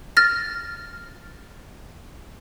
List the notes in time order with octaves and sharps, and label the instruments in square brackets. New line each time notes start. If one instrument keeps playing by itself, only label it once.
[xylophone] F6 A6 A#6